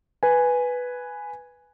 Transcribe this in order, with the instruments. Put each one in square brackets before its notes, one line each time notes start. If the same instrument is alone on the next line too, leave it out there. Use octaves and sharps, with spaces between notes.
[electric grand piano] B4 G#5